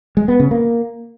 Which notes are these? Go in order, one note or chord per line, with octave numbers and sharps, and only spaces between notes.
G#3
B3
C#3
A#3